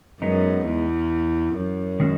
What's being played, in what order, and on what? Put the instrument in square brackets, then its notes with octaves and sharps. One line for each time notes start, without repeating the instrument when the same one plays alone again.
[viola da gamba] F#2 [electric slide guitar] G#3 B3 D#4
[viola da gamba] E2
F#2
[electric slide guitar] D#3 G#3 C#4 F#4